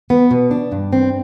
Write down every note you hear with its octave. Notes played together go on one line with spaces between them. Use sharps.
B3
B2
D4
G2
C4